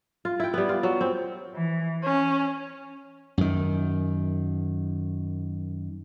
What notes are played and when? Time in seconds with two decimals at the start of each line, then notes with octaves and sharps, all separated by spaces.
0.25 F4
0.40 E4 G5
0.54 G3 B3
0.69 F4
0.83 F#3
1.01 C4
1.54 E3
2.04 C#4
3.38 F#2 D#3